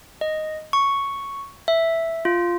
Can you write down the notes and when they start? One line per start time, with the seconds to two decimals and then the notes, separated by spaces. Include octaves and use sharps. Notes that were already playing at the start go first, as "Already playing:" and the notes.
0.21 D#5
0.73 C#6
1.68 E5
2.25 F4